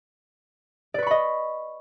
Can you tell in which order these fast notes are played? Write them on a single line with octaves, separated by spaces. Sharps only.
D5 B4 C#6 B5 D#5